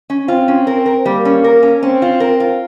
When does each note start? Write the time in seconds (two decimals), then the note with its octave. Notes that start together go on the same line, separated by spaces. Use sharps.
0.10 C#4
0.28 C4 F4
0.48 C#4
0.67 A#4
0.86 A#4
1.06 G3 A#3
1.25 C#4
1.44 A#4
1.63 C#4
1.82 C4 C#4
2.02 F4
2.20 A#4
2.40 F4